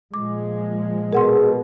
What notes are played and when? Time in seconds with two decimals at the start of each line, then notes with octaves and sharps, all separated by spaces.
0.14 A#2 F3 G#3 D6
1.13 B2 G#4 A#4 F#5 C6